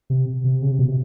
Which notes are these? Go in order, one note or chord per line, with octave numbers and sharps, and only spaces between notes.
C3
C3
C#3
C3
B2
C3